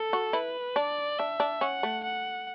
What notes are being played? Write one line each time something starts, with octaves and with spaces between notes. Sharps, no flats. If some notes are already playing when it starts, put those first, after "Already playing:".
Already playing: A4
F#4
E4 B4
D4 D5
D4 E5
D4
C#4 F#5
A3
F#5